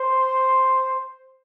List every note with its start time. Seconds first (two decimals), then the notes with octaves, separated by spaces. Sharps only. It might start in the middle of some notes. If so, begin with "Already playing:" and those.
Already playing: C5